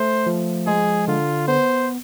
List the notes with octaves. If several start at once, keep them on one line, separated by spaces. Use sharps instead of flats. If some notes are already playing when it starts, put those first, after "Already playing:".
Already playing: A3 C5
F3
G#3 G#4
D3 F4
B3 C5